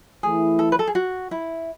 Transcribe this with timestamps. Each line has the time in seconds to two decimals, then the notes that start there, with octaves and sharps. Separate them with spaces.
0.23 E3 A3 E4 G#4
0.59 A4
0.72 B4
0.79 A4
0.87 G#4
0.95 F#4
1.31 E4